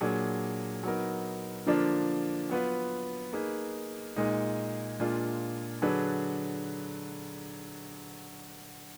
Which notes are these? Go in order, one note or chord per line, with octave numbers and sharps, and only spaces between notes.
A#2 F#3 D4 G#4
F#3 B3 D#4 A#4
D3 F3 A#3 D4 F4
F#3 B3 F4 B4
A#3 D#4 G#4 B4
A#2 G#3 D#4
A#2 G#3 D4 F4
D3 F#3 D4 G#4 B4